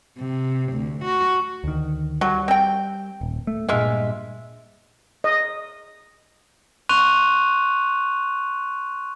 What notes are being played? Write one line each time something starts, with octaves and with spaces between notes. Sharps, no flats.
C3
D2
F#4
D2 D#3
F#3 G3
C4 G5
D#1
A3
G2 A#2 G#3 F4 E5
D#5
C6 C#6 F#6 D#7 F7